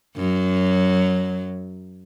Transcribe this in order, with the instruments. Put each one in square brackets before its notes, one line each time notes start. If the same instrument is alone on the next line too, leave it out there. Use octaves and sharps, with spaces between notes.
[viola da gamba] F#2 F#3